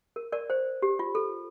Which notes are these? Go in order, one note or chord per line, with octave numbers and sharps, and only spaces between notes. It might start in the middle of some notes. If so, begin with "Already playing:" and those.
A#4
A#4 D5
C5
G4
F4
A4